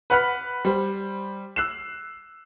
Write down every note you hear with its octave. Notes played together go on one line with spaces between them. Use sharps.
B4 F#5 B5 F6 F#6 B6
G3 C5
E6 F#6 C7 E7